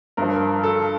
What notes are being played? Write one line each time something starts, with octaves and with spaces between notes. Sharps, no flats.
G2 F3 A#4
A4